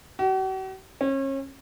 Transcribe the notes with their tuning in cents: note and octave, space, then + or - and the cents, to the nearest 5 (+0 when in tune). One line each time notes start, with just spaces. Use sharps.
F#4 +45
C#4 -35